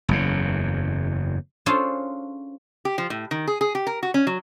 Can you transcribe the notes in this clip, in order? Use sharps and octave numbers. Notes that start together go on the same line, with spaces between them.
F#1 E2 C#3
C#4 D4 F4 G#4 A4 C5
G4
F3
A2
D#3
G#4
G#4
G4
A#4
F#4
C#4
F#3